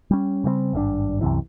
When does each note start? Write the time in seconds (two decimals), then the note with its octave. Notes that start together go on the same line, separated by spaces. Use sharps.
0.11 G3 C#4
0.44 C#3 G3 A#3 C4
0.73 G#1 G2 C#3 D4
1.21 C2 F#2 C3 E3